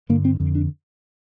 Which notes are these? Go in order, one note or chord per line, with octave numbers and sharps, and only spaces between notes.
G2 D3 A#3
C4
F2 D3
D4